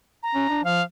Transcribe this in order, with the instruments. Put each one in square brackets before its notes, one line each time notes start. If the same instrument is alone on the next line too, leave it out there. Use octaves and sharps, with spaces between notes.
[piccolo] A#5
[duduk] C#4
D4
[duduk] F3 [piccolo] F5